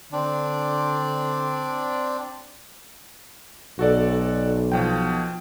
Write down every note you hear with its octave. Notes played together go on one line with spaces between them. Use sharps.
D3 C4 D4 D5
B1 F#4 A4 D5
B2 F3 G5